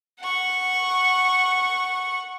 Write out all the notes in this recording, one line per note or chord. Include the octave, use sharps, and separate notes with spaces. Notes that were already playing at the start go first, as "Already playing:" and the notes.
F#5 C#6